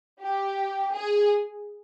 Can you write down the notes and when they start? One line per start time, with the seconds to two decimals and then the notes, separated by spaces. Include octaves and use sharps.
0.21 G4
0.93 G#4